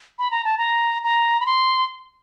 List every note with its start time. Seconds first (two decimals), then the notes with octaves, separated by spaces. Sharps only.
0.19 B5
0.31 A#5
0.45 A5
0.58 A#5
1.04 A#5
1.40 B5
1.46 C6